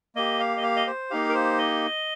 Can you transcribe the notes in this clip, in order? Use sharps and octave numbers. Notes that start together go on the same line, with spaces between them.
A#3 G4 D#5
F5
D#5
F5
D#5
C5
A#3 D#4 G4 F5
A#4
C5
D#5